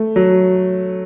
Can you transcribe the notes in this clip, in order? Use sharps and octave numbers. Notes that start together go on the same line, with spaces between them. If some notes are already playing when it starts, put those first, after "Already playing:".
Already playing: A3
F#3